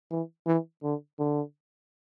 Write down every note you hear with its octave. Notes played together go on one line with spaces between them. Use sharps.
E3
E3
D3
D3